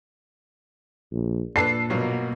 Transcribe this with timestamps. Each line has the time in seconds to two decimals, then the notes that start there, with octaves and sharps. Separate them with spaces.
1.12 A#1
1.56 A#2 D4 A4 B4 C7
1.90 G2 B2 F#3 A#3 F4